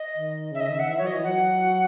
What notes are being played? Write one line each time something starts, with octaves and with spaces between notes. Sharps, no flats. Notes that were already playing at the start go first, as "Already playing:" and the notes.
Already playing: D#5
D#3
C#3 E5
D#5
D#3 E5
F#5
E3 E5
F#3 C#5
D#5
E3
F#3 F#5